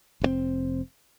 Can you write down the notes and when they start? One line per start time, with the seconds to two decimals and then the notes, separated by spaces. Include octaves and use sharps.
0.22 F1 B2 C4